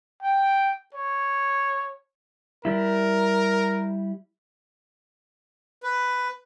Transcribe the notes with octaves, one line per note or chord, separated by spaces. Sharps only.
G5
C#5
G3 E4 A#4
B4